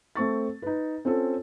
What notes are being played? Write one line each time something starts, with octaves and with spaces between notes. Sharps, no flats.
A3 C4 C#6 A6
D#4 B4
C4 C#4 F4 A4